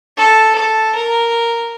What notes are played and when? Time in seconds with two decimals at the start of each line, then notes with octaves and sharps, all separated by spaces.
0.17 A4
0.55 A4
0.95 A#4